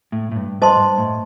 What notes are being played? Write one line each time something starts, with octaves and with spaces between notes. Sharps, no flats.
A2
A2
G2
G2 C5 D#5 A5 C6
G2
A2